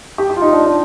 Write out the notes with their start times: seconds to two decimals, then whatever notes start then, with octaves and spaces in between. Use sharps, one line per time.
0.18 G4
0.30 G4
0.36 F4
0.41 D#4
0.53 D4
0.65 D4